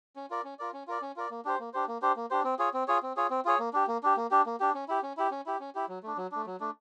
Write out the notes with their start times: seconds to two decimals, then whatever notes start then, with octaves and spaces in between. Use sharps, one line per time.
0.16 C#4
0.30 F4 A#4 D5
0.44 C#4
0.59 F4 A#4 D5
0.73 C#4
0.87 F4 A#4 D5
1.02 C#4
1.16 F4 A#4 D5
1.31 A#3
1.45 D4 G4 C5
1.60 A#3
1.74 D4 G4 C5
1.88 A#3
2.02 D4 G4 C5
2.16 A#3
2.31 D4 G4 C5
2.44 C4
2.59 F4 G#4 C#5
2.74 C4
2.88 F4 G#4 C#5
3.03 C4
3.17 F4 G#4 C#5
3.30 C4
3.45 F4 G#4 C#5
3.59 A#3
3.73 D4 G4
3.88 A#3
4.03 D4 G4
4.17 A#3
4.31 D4 G4
4.46 A#3
4.60 D4 G4
4.74 C#4
4.88 E4 G4
5.03 C#4
5.17 E4 G4
5.31 C#4
5.46 E4 G4
5.60 C#4
5.75 E4 G4
5.89 F#3
6.03 A3 D4
6.17 F#3
6.32 A3 D4
6.46 F#3
6.60 A3 D4